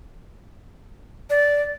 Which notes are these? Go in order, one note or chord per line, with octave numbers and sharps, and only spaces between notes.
D5